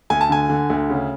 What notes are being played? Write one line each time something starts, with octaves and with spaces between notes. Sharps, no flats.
D2 G#5
A5
D3 G#5
D3
D2
C#3